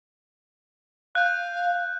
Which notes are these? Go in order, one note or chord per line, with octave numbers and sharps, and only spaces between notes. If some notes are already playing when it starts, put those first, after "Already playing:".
F5 F#6 G6